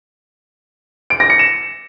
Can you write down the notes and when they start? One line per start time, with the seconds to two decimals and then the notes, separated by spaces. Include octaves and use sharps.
1.10 D7
1.20 A#6
1.30 C#7
1.39 E7